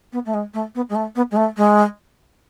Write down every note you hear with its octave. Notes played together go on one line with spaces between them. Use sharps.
B3
A3
G#3
A3
B3
G#3
A3
B3
G#3
A3
G#3